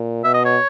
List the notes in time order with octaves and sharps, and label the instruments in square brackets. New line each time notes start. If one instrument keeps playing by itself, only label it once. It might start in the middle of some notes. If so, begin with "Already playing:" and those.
Already playing: [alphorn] A#2
[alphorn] B2 [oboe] E5
[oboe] D#5
C#5